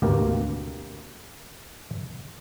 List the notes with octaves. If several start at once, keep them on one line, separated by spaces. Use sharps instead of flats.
G#1 D2 B2 A#3 G4 A#4